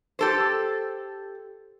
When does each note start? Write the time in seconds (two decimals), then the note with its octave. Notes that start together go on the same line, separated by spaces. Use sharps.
0.19 G4 A4 C5